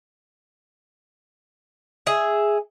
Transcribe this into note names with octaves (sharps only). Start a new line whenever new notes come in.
G#4 E5